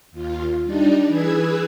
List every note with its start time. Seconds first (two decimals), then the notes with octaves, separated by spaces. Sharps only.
0.12 D#2 F4
0.65 G3 D4 D#4 D5
1.08 E3 G#4 B4 E6 G#6